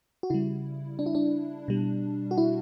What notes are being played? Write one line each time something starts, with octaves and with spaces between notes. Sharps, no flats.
F#4
C#3 G3 E4
D4
E4
D4
B2 G3
F#4
E4